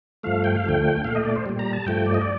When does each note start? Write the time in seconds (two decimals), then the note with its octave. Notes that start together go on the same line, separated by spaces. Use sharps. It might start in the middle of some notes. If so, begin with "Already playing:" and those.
0.23 G2 F3 A3 F5
0.44 G5
0.56 F5
0.64 D2 D3 F3 A3 G5
1.04 A#2 A3 F5
1.15 D#5
1.25 D5
1.35 C5
1.46 A#2 G3
1.59 A#5
1.73 A5
1.86 G2 F3 A3 G5
2.06 D5
2.14 D#5
2.21 D5